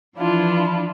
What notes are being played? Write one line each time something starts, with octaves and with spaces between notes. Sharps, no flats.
E3 F3 D4 E4 F4